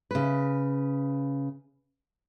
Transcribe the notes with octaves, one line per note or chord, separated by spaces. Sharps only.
C#3 B4